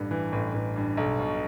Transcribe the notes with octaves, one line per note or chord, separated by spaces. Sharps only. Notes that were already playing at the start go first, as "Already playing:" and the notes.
Already playing: A1 G2
E3
A1
A1
G2
B1
B2